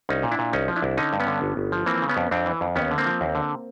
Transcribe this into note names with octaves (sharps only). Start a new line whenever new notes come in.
C2 C#4 D#4
A#2
D4 E4
A#2
C2 C#4 D#4
F3
D4 E4
C2
D3 C#4 D#4
G2
B3 C#4
D3
G1
G1
F3
E3 A#3 C4
C#3
B3 C#4
F2
F2 C4 D4
E3
F2
D#2 B3 C#4
D3
A#3 C4
F3
D#2
D3